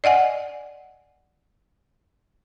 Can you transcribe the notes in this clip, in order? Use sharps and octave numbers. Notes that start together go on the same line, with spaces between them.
D5 D#5 F#5 G#5